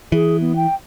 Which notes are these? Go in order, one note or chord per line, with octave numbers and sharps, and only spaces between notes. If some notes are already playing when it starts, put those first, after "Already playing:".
E3 G#4
B3
G5